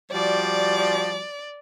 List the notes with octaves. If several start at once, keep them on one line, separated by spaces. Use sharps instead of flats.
F3 G3 F#4 D5